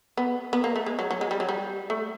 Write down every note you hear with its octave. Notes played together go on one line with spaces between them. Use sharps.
B3
B3
A#3
A3
G#3
F#3
F#3
G#3
G3
F#3
G3
A3